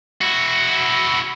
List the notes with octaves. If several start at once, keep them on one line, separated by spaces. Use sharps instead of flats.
E4 F#4